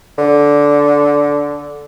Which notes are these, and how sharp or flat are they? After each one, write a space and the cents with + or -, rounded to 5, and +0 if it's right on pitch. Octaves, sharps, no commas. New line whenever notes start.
D3 -10